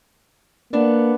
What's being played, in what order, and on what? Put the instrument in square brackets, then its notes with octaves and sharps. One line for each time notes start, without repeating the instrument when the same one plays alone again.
[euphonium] A#3 [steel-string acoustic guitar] B3 D4 F#5